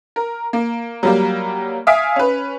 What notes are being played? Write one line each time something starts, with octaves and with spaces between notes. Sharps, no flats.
A#4
A#3
F#3 G3 A#3
E5 F5 G#5 D#6 B6 D7
C#4 B4